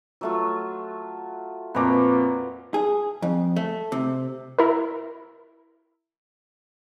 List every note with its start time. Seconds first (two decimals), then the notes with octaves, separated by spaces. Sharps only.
0.21 F#3 A3 F4
1.75 F2 A#2 B4 C#5 A#5 D6
2.74 G#4
3.22 F2
3.56 A3
3.92 C3
4.59 E4 A#4